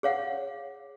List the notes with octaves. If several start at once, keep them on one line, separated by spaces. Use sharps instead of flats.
G#4 C#5 F5 F#5